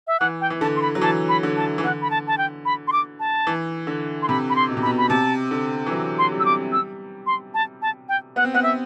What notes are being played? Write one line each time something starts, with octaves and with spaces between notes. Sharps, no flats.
E5
E3 F#5
G5
E3
D3 A5
C6
B5
F#3
E3 A5
B5
D3
A5
E3
D3 F#5
B5
A5
A5
G5
B5
C6
D6
A5
E3
D3
C6
C3 B5
B5
C6
B2
C3
B2 B5
B5
C3 A5
D3
E3
F#3
C6
G3
E6
D6
E6
C6
A5
A5
G5
B3 F#5
C4
B3 F#5
E5